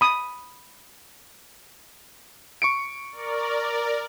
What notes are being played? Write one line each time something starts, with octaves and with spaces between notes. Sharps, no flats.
B5 D#6
C#6 C#7 D7
A#4 D5